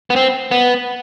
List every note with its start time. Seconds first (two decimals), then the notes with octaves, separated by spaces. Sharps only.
0.10 B3
0.16 C4
0.51 B3